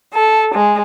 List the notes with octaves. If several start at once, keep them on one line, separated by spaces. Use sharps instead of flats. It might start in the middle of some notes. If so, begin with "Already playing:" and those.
A4
G#3